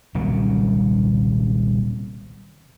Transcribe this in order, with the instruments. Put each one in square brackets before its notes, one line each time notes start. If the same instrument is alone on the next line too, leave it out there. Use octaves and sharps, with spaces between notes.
[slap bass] D#1 C2 C#3 F#3